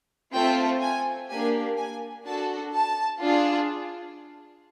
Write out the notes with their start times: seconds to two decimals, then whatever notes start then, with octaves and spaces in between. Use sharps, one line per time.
0.34 A3 C4 F4 G5
0.81 G#5
1.29 A#3 D4 G4 G#5
1.77 G#5
2.25 D4 F#4 A4 A5
2.74 A5
3.21 D4 F4 G#4